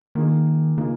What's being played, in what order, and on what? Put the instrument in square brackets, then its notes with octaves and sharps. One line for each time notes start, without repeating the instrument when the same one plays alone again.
[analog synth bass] D#3 [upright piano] A#3 D#4 G#4
[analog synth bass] C#3 [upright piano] A#3 D#4 G#4